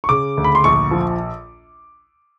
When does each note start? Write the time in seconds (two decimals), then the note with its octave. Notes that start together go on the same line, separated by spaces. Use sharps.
0.04 C#6
0.09 C#3 D6
0.37 D2
0.44 B5
0.55 C6
0.64 A#1 C#6
0.91 F3